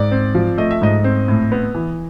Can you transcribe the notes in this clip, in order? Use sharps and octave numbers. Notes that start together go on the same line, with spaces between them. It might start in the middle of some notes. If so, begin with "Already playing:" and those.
Already playing: G#2 D5
C4
F3
A3 D#5
E5
G#2 D#5
C4
A2
B3
E3